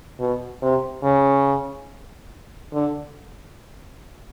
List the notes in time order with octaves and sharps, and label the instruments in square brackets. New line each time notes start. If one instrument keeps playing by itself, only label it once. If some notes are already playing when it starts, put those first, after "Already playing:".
[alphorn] B2
C3
C#3
D3